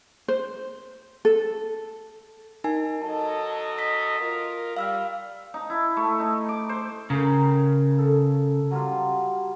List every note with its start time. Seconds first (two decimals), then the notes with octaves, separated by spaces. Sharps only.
0.28 C5
1.25 A4
2.64 D#4 A#4 G#5
3.02 F#3 A4 D#5 A5
3.79 D#6 B6
4.20 F4 A#4
4.77 G3 F5 E6 F6
5.54 D#4
5.70 E4
5.96 A3
6.20 D#4
6.49 D6
6.69 C5
7.10 C#3 A#4 G5
7.98 A4
8.71 F#3 G3 F4